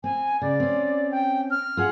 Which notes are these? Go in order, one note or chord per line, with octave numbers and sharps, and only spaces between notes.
C4 G#5
C#3 D5
C4 C#4
G5
F6
F4 G#4 F#5